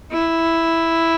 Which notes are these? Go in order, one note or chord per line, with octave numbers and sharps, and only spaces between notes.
E4